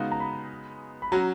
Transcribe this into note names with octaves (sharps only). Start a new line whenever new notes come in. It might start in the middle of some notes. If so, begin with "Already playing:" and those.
Already playing: C#3 G#3 B3 D#4 F#4 F5
A#5
B5
B5
F#3 C#4 F#4 A#5